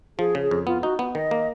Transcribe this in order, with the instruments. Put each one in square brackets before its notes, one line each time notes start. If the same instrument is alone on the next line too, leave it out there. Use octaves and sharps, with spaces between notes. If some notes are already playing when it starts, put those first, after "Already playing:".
[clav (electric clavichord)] F3 [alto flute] G#4
[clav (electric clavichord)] C#3
[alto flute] G#4
[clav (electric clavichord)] F2
[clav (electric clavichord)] B3 [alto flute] F4
[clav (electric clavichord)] D#4 [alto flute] F#4
[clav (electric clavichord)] B3
[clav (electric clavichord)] D#3 [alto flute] D#5
[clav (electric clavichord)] A#3